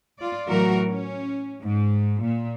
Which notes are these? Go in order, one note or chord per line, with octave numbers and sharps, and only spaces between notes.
F4 D5
A2 E3 F#3 F#4 A#4
C#4
G#2
A#2